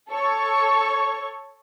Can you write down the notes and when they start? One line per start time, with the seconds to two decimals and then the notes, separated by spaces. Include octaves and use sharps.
0.11 A4 C#5 C#6